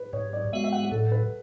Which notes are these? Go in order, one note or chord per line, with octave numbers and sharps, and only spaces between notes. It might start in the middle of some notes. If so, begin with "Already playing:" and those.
Already playing: B4
G#2 C#5
D5
G#3 B3 F#4 E5
E5
F#5
A2 A4
B4